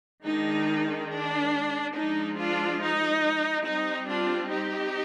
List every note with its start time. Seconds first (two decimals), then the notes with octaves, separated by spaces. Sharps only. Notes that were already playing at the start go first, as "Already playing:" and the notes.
0.24 D#3 G#3 D4 D#4
1.10 D4
1.95 F3 G#3 D4 D#4
2.37 D4 F4
2.81 D#4
3.65 G3 C4 D#4
4.07 D4 F4
4.50 D#4 G4